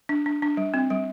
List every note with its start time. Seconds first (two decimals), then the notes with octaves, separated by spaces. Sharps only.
0.09 D4
0.26 D4
0.42 D4
0.57 G3
0.74 C4
0.90 G3